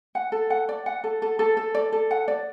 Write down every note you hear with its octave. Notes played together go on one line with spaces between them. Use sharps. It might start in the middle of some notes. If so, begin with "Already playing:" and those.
F#5
A4
F#5
D5
F#5
A4
A4
A4
A4
D5
A4
F#5
D5